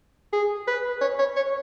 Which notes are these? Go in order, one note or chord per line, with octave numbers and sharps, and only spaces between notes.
G#4
B4
C#5
C#5
C#5